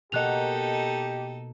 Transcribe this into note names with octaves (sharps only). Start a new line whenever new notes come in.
B2 A#3 D#4 G4 A4 D#5 F#6 F7